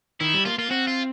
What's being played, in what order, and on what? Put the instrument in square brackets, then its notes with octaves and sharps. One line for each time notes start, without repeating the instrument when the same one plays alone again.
[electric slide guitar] D#3 [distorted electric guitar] E4
[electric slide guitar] G3
[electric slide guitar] A#3 [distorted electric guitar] F4
[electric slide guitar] A#3 [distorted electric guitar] F4
[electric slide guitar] C4 [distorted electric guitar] F#4
[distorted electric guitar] F4